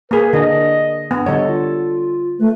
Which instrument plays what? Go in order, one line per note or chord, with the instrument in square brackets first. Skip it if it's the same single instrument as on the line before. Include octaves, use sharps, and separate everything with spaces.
[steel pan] A#3 G#4 A#4 [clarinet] B4
[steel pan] D3 [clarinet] D#5
[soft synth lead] G2 [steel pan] B3
[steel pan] D3 G3 C#5 [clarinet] A4 [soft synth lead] D#5
[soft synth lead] F4
[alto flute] A3 [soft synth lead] B4